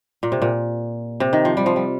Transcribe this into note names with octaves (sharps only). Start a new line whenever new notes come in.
A#2
C3
A#2
C3
D#3
F3
G3
F3
G3